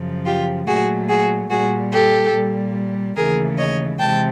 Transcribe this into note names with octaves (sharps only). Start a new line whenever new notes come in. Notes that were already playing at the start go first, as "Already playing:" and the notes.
Already playing: F#2 C#3 F3
F4 G4
A#2 F#3 A3 F#4 G#4
F#4 G#4
A#2 G3 F#4 G#4
G4 A4
A#2 G3
D#2 C#3 E3 A3 G#4 A#4
C#5 D#5
C3 E3 G#3 G5 A5